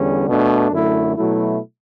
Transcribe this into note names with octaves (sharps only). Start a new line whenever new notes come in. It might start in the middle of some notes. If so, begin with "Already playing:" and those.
Already playing: E2 D3 G3 C#4
B2 A3 D4
F#2 D3 A3 E4
B2 F#3 A3 E4